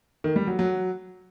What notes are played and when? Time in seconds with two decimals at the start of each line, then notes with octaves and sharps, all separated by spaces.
0.24 D#3
0.36 G3
0.47 F#3
0.59 F#3